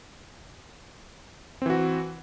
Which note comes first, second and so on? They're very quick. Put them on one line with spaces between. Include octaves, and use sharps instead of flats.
C4 E3 F#4